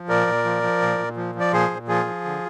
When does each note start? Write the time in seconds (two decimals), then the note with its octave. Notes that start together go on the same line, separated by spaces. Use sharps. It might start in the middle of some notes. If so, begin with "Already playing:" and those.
Already playing: F3
0.09 A#2 A#4 D5
0.27 A#2
0.45 F3
0.63 F3
0.82 A#2
0.99 A#2
1.17 F3
1.35 F3 D5
1.52 A#2 G#4 C5
1.70 A#2
1.88 F3 F4 G#4
2.06 F3
2.25 D3